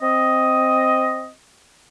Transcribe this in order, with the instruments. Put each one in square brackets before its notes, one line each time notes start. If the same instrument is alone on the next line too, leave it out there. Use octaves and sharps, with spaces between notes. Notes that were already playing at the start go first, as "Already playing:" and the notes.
[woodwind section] C4 D#5